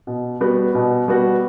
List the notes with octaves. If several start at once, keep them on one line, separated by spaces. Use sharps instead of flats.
B2
G3 B3 F#4
B2
G3 B3 F#4